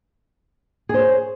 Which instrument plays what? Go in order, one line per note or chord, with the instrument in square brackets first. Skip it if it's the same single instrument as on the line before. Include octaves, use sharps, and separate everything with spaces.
[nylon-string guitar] G#4
C5
C#5